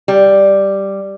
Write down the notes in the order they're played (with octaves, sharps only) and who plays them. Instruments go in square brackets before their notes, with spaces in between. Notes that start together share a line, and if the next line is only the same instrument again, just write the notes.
[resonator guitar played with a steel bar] G3